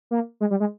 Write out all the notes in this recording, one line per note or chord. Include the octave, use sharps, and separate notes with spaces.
A#3
G#3
G3
G#3